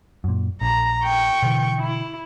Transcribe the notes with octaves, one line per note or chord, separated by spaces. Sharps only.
F#2 A#2
A#1 A#5
G5 C#6
B2 D3 E3
E4